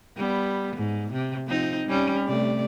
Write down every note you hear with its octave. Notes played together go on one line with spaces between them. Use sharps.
G3 B3
G#2
C3
F3 C4 D#4
G3 C#4
C3 A3 D5